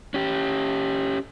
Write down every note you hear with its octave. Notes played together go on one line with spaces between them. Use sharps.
C#4 G4